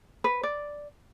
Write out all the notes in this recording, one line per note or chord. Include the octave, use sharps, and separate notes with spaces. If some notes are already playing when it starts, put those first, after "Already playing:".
B4
D5